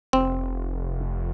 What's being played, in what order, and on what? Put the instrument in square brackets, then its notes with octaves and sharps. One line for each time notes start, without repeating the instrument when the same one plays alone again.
[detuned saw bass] F1 [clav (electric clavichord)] C4